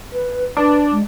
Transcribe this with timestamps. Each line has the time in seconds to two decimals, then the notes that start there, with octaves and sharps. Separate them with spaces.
0.13 B4
0.57 D4 B4
0.91 G#3